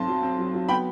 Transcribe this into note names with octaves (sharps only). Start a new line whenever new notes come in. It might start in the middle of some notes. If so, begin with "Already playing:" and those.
Already playing: B1 C4 A5 C6
F#3
C4
F#3
F#3
B3 G5 B5